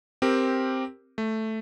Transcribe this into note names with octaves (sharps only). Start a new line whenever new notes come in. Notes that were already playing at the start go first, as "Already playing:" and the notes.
C4 G4 A#4
A3